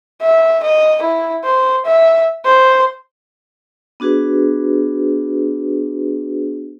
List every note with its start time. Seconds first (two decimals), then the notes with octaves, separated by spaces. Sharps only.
0.21 E5
0.63 D#5
1.03 E4
1.44 C5
1.85 E5
2.45 C5
4.00 B3 D4 F#4 G#4 B4